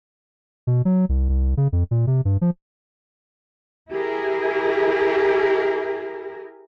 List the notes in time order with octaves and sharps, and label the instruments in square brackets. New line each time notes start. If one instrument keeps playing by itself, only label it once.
[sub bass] B2
F#3
C2
C2
C#3
F2
A#2
C3
G2
F3
[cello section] E4 G4 G#4 A#4